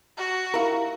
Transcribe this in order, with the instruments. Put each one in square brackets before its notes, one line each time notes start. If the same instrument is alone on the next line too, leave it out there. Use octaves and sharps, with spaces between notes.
[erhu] F#4
[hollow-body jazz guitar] E4 A#4 [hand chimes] G4 F5